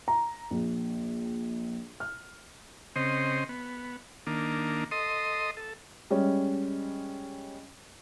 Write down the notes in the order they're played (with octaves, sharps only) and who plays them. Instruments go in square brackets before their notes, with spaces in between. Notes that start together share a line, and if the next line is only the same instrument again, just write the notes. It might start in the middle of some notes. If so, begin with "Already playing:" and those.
[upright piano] A#5
A#1
F6
[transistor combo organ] C#3 C4 C5 D#5
B3
D#3 A#3 D4
A4 D#5 C6 D#6
A4
[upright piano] G3 G#3 C#4